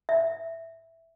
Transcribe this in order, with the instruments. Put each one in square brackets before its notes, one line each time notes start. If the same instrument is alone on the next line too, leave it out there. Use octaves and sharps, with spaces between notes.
[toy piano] E5